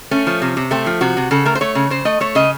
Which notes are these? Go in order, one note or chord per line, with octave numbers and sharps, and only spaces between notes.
A3 C#4
F3
C3
C3
A3 C4
F3
C3 F#4
C3
C#3 A4
A3 A#4
C5
A3 C#5
C#3
C#3 C5
A3 D#5
A3 C#5
C#3 D#5